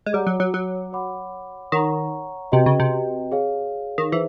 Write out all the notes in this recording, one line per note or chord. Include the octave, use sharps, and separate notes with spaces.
G#3
G3 C#5 F#5 A#5 D6
F#3
F#3
F#3
C#5 F#5 B5 D6
D#3 C#5 F#5 A#5 C#6
C3 F#4 B4 D#5 G5
C#3
C3
G#4 C#5 F5
D#3
E3 E4 G#4 C5 E5